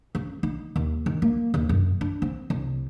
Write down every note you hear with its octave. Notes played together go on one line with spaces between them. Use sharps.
C#4
D#4
D#2
D#3
A#3
D#2
F#2
D4
C4
C2